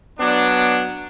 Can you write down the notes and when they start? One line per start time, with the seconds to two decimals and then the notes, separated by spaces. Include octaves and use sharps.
0.19 F#3 B3 D4